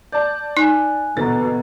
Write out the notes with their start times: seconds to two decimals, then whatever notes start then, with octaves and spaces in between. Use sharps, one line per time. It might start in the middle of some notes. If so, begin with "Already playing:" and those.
0.12 D5 A5 G6
0.57 D#4 G#5 F#6
1.17 D2 B2 E3 A4 B4 A#5 A6